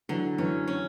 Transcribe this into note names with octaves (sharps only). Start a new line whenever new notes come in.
D3 E3 F#3
E3 F#3 C#4
C#4